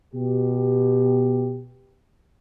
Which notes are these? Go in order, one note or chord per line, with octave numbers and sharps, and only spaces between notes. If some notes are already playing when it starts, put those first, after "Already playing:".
B2 G4